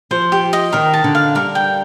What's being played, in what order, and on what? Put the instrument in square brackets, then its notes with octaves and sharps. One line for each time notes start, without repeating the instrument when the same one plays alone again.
[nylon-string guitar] F3 [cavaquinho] C5
[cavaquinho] G4
D#5
[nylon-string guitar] D#3 [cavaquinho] A#4
[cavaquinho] A5
[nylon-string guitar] D3
[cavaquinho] F5
[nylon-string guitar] G3 [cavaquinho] A#4
[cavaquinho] G5